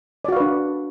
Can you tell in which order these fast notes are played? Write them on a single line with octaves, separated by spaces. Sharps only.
D5 F#4 F5 B4 D4